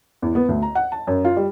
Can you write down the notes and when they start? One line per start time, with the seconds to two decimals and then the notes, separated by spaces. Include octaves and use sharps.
0.22 E2
0.35 B3
0.49 D2
0.62 A#5
0.75 F#5
0.92 A5
1.07 F#2
1.25 F4
1.36 G3